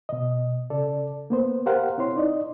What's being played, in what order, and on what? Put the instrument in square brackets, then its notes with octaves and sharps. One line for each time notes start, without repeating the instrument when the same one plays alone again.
[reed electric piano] B2 D#5
C#3 A4 D5
A#3 B3 C5
G4 A#4 C5 F5 F#5
C4 E4 C#5 C6
D#4 D5 D#5